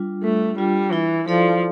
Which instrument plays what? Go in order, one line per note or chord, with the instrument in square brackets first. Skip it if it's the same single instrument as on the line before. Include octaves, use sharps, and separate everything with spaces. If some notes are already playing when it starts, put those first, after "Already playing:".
Already playing: [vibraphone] G3 D4 F4
[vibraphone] G3 [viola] A3
[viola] G3 [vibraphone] D4 F4
[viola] E3 [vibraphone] E4
[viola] F3 [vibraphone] A4 D5 F5